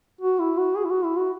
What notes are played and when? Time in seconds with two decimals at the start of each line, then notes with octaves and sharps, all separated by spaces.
0.21 F#4
0.39 E4
0.58 F#4
0.76 G#4
0.85 E4
0.90 F#4
1.04 E4
1.18 F#4